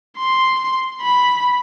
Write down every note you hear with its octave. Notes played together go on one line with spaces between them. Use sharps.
C6
B5